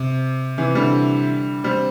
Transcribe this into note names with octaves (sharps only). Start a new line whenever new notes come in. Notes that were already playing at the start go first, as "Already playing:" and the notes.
Already playing: C3
C3 E3
D3 G3
G3 C4